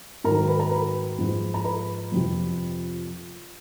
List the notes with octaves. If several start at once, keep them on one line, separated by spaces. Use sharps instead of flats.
G#2 D#3 F#3 A#4 A#5
B4 B5
A#4 A#5
B4 B5
G#2 F3 G#3
A#5
B4 B5
F2 C3 F3